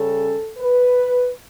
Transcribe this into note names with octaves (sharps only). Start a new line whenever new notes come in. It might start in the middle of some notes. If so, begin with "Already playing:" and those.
Already playing: C#3 G3 C#4 A4
B4